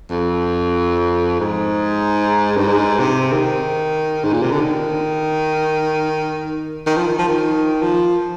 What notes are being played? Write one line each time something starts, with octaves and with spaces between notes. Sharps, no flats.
F2
G#2
G2
G#2
C3
D#3
G#2
A#2
C3
D3
D#3
D#3
F3
D#3
F3
D#3
F3